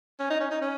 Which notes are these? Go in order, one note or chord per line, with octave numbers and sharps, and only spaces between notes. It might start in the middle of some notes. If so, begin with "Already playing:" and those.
C#4
D#4
C#4
D#4
C#4